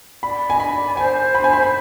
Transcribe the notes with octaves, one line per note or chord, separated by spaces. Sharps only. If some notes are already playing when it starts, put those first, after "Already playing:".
D5 B5
D#5 G#5
B5
D5
C5 G#5
B5
G#5
B5